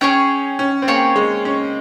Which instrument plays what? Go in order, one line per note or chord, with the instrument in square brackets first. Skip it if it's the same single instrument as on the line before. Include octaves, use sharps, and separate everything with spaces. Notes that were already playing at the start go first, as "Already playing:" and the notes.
[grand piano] C#4 [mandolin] G#4 C#5 G5
[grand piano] C#4
C4
[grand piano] A#3 [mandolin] G#4 C#5 G5
[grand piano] G#3
C#4